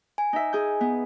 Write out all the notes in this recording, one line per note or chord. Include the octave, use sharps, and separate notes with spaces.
G#5
D#4 E5
G#4 G6
B3